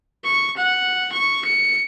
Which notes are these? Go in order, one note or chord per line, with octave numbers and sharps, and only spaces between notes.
C#6
F#5
C#6
C#7